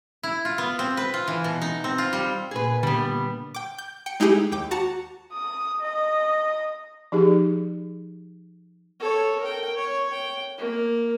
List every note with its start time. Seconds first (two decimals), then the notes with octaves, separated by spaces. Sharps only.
0.23 E4
0.45 F4
0.58 B3
0.79 C4
0.97 B4
1.14 F4
1.27 E3
1.44 B2
1.62 D#4
1.84 C4
1.98 F4
2.13 G3
2.51 A#2 G#4 B4
2.83 D3 G3 B3
3.55 G5 D6
3.78 G6
4.06 G5 C#7
4.20 G#3 D#4 E4 G4 G#4
4.52 D#2 G5 D6
4.71 F#4 A5 A#5 C#7
5.32 D#6
5.81 D#5
7.12 F3 D#4 G4 G#4
9.00 A4 C#5
9.40 A#4 G5
9.76 C#5
10.11 G5
10.58 A#3